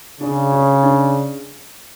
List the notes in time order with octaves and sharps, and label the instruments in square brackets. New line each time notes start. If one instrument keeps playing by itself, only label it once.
[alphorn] C#3 [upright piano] D4
[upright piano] C#4
D4